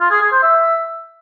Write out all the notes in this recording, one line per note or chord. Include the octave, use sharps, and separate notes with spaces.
F4
G#4
G#4
C5
E5